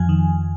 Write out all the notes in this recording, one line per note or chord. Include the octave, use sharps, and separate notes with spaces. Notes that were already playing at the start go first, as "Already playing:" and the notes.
Already playing: F2 F3 G#5
D#3